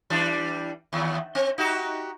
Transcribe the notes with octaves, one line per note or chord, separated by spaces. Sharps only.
E3 G3 D4
D#2
C4
D#4 F#4 G4